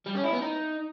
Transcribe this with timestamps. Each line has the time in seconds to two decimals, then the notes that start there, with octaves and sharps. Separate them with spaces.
0.06 G3
0.15 C#4
0.24 E4
0.32 B3
0.41 D#4